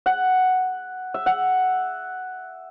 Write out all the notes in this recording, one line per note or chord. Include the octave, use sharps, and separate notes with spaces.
F#5
E5
F#5